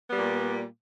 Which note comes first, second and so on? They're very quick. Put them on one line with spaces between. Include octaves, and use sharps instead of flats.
B3 G3 A#2